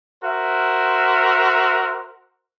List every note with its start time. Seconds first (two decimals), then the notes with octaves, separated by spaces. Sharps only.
0.23 F#4 A#4 C5 E5